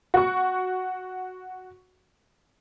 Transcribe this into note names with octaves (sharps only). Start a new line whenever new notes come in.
F#4 C#6